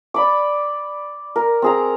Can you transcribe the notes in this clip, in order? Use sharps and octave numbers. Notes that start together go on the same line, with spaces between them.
D5 B5 D6
A#4
C4 G#4 A#5